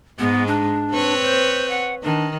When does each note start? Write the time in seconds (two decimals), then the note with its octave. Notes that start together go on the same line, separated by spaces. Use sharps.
0.19 G#2 G#3 B3
0.47 D4
0.92 C4 B4 C#5
1.24 C5
1.70 F#5
2.04 D#3 D4